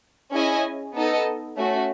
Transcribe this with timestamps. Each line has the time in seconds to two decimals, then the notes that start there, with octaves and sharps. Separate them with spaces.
0.33 C#4 E4 G#4 D#5 G#5
0.94 B3 D#4 A4 D#5
1.56 A3 C#4 F#4